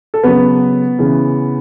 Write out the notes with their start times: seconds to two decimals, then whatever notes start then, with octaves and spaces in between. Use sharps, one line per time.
0.14 A4
0.24 C#3 F#3 B3 B4
0.99 C#3 E3